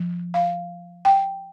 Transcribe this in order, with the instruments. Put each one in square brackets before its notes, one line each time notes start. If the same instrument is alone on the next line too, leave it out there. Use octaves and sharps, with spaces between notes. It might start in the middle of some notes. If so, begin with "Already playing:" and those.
Already playing: [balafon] F3
F5
G5